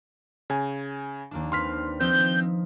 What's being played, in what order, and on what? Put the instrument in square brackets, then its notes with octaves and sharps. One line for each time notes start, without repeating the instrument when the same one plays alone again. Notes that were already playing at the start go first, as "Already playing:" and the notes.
[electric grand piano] C#3 G#5
[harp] D#2 A#3 D4
[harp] C4 B4 [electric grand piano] C6 F6 B6
[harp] F3 D#4 [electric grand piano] C4 [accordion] G6